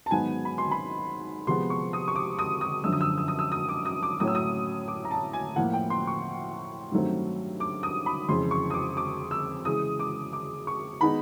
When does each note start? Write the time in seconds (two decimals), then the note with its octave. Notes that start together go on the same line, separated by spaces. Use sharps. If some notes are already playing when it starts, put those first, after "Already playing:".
0.06 A5
0.11 G#2 D#3 F#3 B3 G#5
0.45 B5
0.58 C6
0.71 B5
1.47 C3 F3 G#3 B3 C6
1.70 C#6
1.93 D#6
2.08 C#6
2.15 D6
2.39 D#6
2.61 D#6
2.84 F#2 D3 F3 E6
2.92 D#6
3.01 E6
3.18 E6
3.28 D#6
3.39 E6
3.52 D#6
3.69 D6
3.85 D#6
4.03 D6
4.20 A2 F#3 A3 C#4 D#6
4.27 E6
4.35 D#6
4.88 D6
5.05 A#5
5.11 A5
5.33 G#5
5.56 A2 F3 A#3 F#5
5.73 G5
5.90 C6
6.07 C#6
6.92 G2 D#3 F#3 A3 C4
7.60 D6
7.83 D#6
8.06 B5
8.29 F2 C#3 E3 G#3 C6
8.51 C#6
8.70 D#6
8.74 D6
8.97 D6
9.31 E6
9.65 C#3 E3 G#3 D#6
9.99 D6
10.33 D6
10.67 C#6
11.01 D#3 G#3 B3 D#4 B5